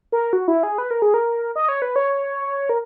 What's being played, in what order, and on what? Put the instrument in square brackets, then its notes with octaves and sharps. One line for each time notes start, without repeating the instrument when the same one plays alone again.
[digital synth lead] A#4
F#4
E4
G#4
B4
A#4
G#4
A#4
D#5
C#5
B4
C#5
A#4